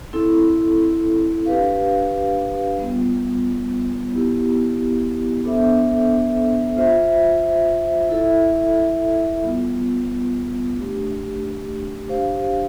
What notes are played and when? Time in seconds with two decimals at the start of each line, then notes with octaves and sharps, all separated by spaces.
0.13 C4 E4 A4
1.46 D4 G4 B4 F5
2.79 G3 B3 F4
4.11 B3 E4 G4
5.44 B3 D4 A4 C5 E5
6.77 F4 C5 E5
8.09 E4 A4 E5
9.42 G3 B3 F4
10.75 A3 D4 G4
12.07 D4 G4 C5 F5